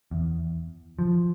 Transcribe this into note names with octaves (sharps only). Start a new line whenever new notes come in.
E2
F3